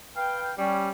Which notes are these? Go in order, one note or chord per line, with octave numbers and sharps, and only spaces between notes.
B4 F5 G5
G3 C#4